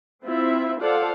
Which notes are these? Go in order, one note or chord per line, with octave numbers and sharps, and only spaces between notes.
C4 E4 F4 E5
F4 A4 C5 D5 F5 F#5